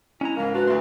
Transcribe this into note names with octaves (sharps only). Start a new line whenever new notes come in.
G#3 C#4 E4 A#5
C#2 G#2 A#4 F5
D4 F4 F#4 B4
D2 A3 D4 C6